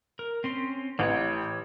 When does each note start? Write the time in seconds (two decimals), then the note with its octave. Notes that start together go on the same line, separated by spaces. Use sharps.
0.19 A#4
0.44 C4 C#4 C6
0.99 A1 E3 G4 C#5